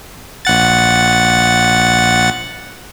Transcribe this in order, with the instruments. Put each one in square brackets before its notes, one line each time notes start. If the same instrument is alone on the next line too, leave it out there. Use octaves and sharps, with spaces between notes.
[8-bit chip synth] A#1 F#5 A6